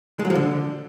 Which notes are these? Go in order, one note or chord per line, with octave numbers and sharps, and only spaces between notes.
G#3
F#3
F3
D3